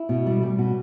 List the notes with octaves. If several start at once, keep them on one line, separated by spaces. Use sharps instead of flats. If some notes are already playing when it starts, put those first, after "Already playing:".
Already playing: E4
B2
G3
G3
B2 F#4